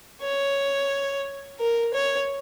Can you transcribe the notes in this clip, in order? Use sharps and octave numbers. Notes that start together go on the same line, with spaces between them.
C#5
A#4
C#5